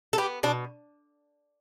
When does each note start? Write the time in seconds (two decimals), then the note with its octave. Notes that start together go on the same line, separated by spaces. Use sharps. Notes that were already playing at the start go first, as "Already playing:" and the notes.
0.13 A4
0.18 B3 G4
0.43 B2 D4